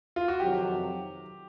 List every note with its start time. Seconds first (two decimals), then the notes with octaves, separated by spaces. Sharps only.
0.16 F4
0.28 F#4
0.40 F2 C3 D#3 F#3 G4